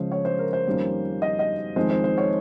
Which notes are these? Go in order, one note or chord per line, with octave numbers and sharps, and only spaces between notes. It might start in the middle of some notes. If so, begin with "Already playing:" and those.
Already playing: C#3 F3 G#3 C#4 C5
C#5
C5
A#4
C5
F2 D#3 G3 A#3 C#4
D#5
D#5
F2 D#3 G#3 C4 C5
C5
C5
C#5